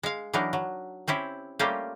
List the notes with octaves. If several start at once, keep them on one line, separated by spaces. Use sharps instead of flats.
G#3 F5
E3 F#3 D4 D#4 A#4
F#3
C4 C#4 E4 G4
G3 A3 A#3 C#4 F4 G4